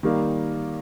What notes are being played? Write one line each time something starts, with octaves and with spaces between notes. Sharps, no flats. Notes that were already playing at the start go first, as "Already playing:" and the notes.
D#3 G3 A#3